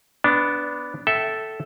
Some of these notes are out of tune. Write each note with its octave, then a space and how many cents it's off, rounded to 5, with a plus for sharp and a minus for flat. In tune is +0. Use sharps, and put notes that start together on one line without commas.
B3 +0 D4 -10
A4 +0 E5 +0 G5 -35